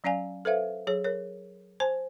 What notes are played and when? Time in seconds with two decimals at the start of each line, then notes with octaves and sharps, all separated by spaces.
0.04 F#3 C#4 D5 F5 G#5
0.45 A4 B4 C5 E5 F5
0.87 F#3 G#4 C#5
1.04 A#4 C#5
1.80 C5 G#5 A5